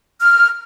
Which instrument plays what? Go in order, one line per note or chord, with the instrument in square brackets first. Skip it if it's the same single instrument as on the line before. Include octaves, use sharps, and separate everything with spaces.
[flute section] F6